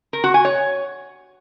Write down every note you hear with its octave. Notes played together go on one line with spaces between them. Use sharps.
A#4
F#4
G#5
C#5